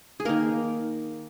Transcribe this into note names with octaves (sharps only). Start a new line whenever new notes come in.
G#4
D#3 A#3 A#4